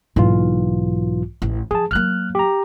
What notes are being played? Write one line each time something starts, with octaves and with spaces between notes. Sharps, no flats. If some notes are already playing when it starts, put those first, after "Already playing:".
B1 G#2 E3 A#3 F4
A1
F3 G#4 A5
F#3 A#3 F6 F#6
G4 A#5